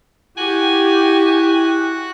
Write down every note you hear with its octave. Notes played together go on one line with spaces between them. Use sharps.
E4 F#4 G4 G#5 F#6